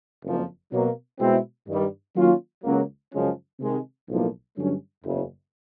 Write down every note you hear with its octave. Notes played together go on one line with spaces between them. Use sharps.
F#1 F2 C#3 F3 A#3
B2 F#3 A#3
B2 G#3 C4 E4
G2 D#3 G3
D#3 F#3 A#3 C#4 F4
C#2 C#3 F#3 A#3
F#2 C#3 F3 G#3 C#4
C3 D#3 G#3
B1 A2 F3 A#3
G2 D3 F#3 A3 C#4
F#1 E2 C#3